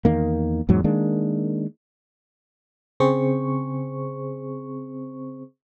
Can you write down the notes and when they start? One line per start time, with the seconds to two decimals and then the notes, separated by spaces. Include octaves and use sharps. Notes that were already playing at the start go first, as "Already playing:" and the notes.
0.05 E2 D#3 A#3
0.69 E2 G#2 F#3
0.84 D#3 G#3 A#3 D4
3.00 C#3 C4 G#4 C5 C#6